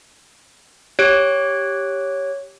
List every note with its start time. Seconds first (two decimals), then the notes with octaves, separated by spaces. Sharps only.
0.99 G4 C#5 F#6 D7